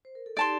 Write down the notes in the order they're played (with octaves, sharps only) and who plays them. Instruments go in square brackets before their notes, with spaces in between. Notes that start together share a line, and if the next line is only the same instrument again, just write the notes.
[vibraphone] C5
A#4
A4
[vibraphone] D#4 G4 [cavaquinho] D5 A5 C6